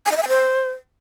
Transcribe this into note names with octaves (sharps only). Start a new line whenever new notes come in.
G#5
D#5
E5
G#5
C5